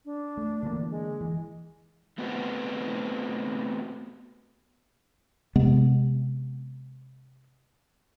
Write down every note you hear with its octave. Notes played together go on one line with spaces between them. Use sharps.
D4
A3
D3 E3 A#3
G#3
E3
A3 B3 C4 F#4 B4
C3 G#3 B3